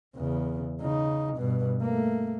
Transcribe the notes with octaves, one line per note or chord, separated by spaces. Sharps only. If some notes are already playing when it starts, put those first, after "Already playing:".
E2 C#3
C#3 D#4
G2 B2
A3 A#3